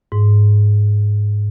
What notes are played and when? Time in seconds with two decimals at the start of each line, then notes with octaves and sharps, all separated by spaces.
0.12 G#2